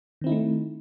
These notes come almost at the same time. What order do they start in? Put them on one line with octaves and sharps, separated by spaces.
D#3 C4 E4 D#4 A3